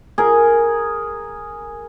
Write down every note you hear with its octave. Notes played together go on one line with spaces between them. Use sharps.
G#4 A#4